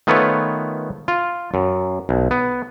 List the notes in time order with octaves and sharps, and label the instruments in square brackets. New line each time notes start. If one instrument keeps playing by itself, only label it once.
[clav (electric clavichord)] D#3 A3 B3 F4 B4 C#5
F4
F#2
B1
B3